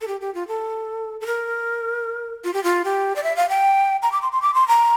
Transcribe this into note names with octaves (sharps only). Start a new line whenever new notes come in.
A4
G4
G4
F4
A4
A4
A#4
F4
G4
F4
G4
D5
E5
F5
G5
A#5
D6
C6
C6
D6
C6
A#5